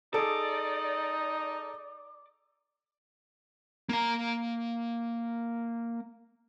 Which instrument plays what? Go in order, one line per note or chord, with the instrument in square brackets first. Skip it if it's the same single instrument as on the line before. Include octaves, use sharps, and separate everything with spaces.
[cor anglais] D#4 [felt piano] G#4 A4 [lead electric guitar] D5
[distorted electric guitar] A#3 A#5